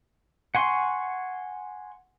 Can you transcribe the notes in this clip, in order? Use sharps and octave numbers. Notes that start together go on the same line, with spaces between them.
F#5 G#5 C6 C#6